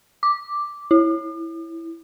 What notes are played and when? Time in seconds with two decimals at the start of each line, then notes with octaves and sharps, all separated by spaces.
0.23 D6
0.91 E4